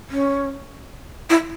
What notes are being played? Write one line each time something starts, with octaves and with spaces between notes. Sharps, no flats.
C#4
E4